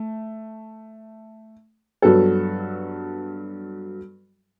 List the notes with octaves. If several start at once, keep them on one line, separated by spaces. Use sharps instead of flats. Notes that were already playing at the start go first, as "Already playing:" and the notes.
Already playing: A3
G2 F#3 B3 F#4 A4